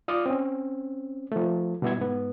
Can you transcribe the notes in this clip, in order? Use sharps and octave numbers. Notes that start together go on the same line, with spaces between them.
F4 D5 D#6 F6
C4 C#4
F3 A3
B2 G3 B3 E4 G#6
G#2 B3